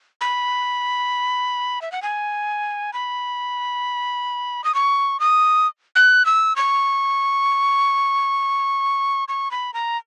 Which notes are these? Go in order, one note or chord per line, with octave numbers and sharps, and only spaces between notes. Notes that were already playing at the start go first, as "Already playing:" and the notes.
B5
E5
F#5
G#5
B5
D#6
C#6
D#6
F#6
E6
C#6
C#6
B5
A#5